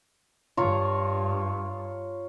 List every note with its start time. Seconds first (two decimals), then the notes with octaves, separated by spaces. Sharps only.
0.57 G2 F4 C#5 A#5